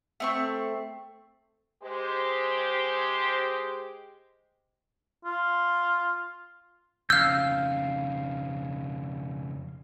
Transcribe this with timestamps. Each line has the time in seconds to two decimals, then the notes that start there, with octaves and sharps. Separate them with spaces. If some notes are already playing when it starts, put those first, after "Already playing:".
0.20 A3 C4 C#6
1.82 G#3 G4 C5
5.25 F4
7.10 F2 C#3 F5 E6 F6 G6